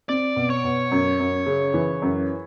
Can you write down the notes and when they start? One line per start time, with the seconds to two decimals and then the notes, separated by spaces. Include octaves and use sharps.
0.09 C4 D5
0.36 B2
0.50 C#5
0.64 B2
0.91 F#2
1.20 F#2
1.46 C#3
1.74 E3
2.02 F#2